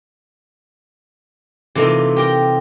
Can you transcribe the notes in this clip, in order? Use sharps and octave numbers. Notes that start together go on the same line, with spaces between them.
C3 E3 A3 A#3 D#4 F4
G4 A#4 G5